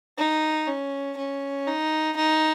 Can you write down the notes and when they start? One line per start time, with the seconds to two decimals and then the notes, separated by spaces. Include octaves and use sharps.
0.18 D#4
0.67 C#4
1.17 C#4
1.67 D#4
2.16 D#4